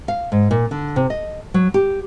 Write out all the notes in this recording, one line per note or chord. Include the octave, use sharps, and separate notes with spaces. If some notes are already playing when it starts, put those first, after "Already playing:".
F5
G#2
A#2
D3
C3
D#5
F#3
G4